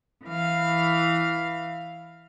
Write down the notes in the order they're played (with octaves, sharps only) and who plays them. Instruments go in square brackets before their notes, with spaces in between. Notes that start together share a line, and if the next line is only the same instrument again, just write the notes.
[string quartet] E3 F5